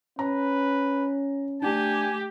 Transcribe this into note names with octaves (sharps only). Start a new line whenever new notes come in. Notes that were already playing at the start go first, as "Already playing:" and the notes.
C#4 B4 A#5
A3 D4 G4 G#5